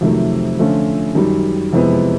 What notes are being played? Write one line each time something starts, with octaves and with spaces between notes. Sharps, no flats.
F2 C3 D#3 F#3 A3
D3 F3 A3 C#4 F4
F#2 D#3 G3
F2 C3 E3 G#3 B3